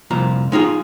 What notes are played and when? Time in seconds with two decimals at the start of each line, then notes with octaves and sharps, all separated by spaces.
0.10 C2 F2 A#2 F3 A#5
0.52 G#3 D#4 F4 G#4